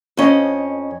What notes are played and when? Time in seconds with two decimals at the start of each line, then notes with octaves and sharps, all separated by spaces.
0.17 F2 C#4 D#5